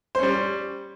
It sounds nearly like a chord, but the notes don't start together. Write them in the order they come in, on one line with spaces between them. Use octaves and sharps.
C5 C#4 G3